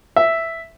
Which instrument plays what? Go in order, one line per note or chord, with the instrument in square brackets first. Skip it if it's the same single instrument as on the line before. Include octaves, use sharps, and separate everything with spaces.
[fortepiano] E5